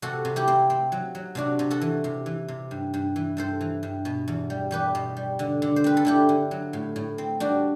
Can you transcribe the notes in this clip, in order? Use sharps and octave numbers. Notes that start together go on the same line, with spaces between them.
C3 F#4 A4
C3
E4 G4
C4
C4
F#3
F#3
C3 D4 F#4
C3
F#4 A4
E3
C3
E3
C3
G2
G2
E3
G2 A4 C5
E3
G2
B2
E2
G3
E2 G4 B4
B2
G3
D3
D3
C5
C4 B4
A4
D3 E4 G4
D3
F#3
A2
A2
C4
G3 D4 F#4